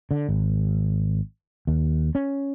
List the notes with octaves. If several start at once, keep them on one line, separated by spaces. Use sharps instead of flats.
D3
G#1
D#2
C#4